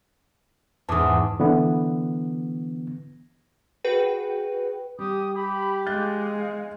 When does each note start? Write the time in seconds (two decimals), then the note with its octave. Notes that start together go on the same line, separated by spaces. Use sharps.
0.89 E2 G#2 A5 D6 D#6
1.40 D3 E3 B3
3.84 F#4 G#4 B4 G5
4.99 G3 G4 D#6
5.35 G4 B5
5.86 G#3 F5 F#6 G6 A6